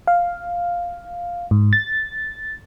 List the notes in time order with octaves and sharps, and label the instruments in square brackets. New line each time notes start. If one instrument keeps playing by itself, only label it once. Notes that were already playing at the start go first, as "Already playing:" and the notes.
[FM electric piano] F5
G#2
A6